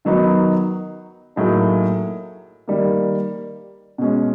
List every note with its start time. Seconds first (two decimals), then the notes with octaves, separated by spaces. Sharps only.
0.05 D#3 F#3 B3 D#4
1.36 A2 F#3 A#3 D#4 G#4
2.68 D#3 G3 A#3
3.98 B2 G#3 C#4